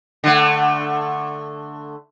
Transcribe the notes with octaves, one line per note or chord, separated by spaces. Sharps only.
D3 A3